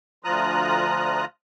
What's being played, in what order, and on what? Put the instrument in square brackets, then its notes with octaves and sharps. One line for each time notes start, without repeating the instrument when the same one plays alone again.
[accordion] D2 F3 F4 A#5 D#6 F#6